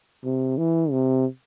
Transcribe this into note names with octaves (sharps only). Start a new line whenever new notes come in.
C3
E3
C3